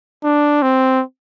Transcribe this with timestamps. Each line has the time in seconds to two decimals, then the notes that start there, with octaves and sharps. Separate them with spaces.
0.24 D4
0.62 C4